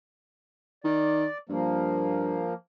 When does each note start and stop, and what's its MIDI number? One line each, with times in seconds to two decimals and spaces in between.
0.84 1.26 51
0.84 1.38 74
1.49 2.48 43
1.49 2.54 53
1.49 2.54 58